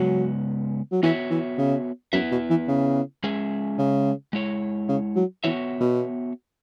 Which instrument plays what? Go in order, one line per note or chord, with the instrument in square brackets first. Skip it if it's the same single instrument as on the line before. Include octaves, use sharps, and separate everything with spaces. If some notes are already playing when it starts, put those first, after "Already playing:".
Already playing: [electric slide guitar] C#3 G#3 B3 [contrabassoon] F#3
[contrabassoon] F#3
[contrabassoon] E3 [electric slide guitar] B3 F#4 C#5 E5
[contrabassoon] E3
C#3
[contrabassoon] F#2 [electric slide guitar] B3 E4 B4 E5
[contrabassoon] B2
E3
C#3
[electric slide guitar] G#3 C#4 G#4 E5
[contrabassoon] C#3
[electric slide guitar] G#3 E4 C#5
[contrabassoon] C#3
F#3
[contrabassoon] E3 [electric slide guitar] B3 F#4 C#5 E5
[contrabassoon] B2